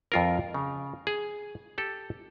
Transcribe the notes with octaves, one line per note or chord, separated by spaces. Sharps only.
F2 F4 A#4
C#3
G#4
G4 A4